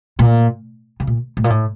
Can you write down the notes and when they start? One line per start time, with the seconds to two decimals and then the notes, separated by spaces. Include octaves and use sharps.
0.19 A#2
1.00 C#3
1.07 A#2
1.37 A2
1.44 A#2
1.50 A2